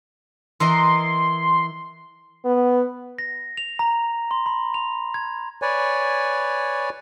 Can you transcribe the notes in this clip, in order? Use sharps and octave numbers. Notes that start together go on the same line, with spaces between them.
E3 A#4 D#5 C6
B3
A#6
F7
A#5
C6
B5
F7
G#6
B4 C#5 D5 G#5